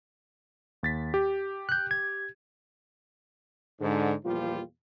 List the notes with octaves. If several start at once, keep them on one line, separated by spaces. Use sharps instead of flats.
D#2 A6 B6
G4
F#6 G6
G#6
G#2 D3
E2 A#2 F3 G3 F4